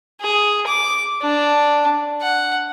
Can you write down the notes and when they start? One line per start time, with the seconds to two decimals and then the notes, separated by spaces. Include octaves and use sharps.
0.21 G#4
0.66 D6
1.22 D4
2.21 F#5